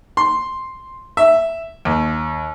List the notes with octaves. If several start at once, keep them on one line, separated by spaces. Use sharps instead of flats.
C6
E5
D#2